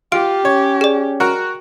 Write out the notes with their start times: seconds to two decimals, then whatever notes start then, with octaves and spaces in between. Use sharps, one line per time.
0.12 F4 G4 D7
0.45 C#4 C#5
0.81 G#4 D5
1.20 F#4 A#4